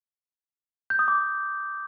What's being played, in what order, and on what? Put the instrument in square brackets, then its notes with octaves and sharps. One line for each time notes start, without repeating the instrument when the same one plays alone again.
[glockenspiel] G6
D#6
D6